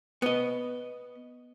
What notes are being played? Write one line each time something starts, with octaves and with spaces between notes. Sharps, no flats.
B3 D#5